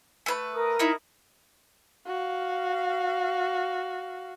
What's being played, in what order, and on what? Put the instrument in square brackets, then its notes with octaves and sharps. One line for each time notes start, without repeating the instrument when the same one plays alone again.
[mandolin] A3 B4
[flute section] A#4 D#6
[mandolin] D#4 E4
[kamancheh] F#4 F5